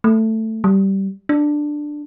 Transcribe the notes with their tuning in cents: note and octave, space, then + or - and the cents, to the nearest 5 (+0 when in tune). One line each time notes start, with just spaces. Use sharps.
A3 +10
G3 -15
D4 +10